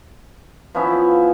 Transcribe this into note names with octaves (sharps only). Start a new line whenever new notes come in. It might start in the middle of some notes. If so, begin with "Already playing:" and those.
F3 B3 C#4 E4